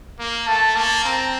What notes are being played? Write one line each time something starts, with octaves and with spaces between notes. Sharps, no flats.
A#3
A3 A5
A#3 A5
C4 A#5